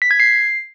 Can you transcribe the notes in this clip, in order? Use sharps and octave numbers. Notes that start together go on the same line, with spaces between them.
B6
G#6
C7